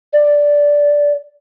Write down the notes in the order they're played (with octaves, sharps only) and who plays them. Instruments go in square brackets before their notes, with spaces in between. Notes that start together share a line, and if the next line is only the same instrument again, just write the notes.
[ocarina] D5